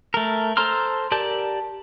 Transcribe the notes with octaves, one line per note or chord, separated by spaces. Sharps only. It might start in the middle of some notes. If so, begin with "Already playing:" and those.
A3 A#4
A4 C5 A#5 C6 F6
G4 A#4 D5 A5 G6